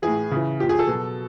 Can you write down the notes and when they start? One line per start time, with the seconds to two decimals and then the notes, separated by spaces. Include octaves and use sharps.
0.02 A2 E3 G#4
0.31 C#3 E3
0.60 A#2 F3 G4
0.69 G#4
0.79 A4
0.88 B2 F#3